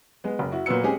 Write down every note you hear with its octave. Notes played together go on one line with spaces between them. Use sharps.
G#3 B3
F#1
E4 F#4
A#2 F#3 B3 B4 E6 C#7
G#3 C4 C#4 G4 G#4